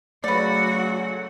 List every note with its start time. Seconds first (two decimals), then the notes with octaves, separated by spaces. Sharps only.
0.24 C#3 F#3 A3 F#4 B4 D5 F#5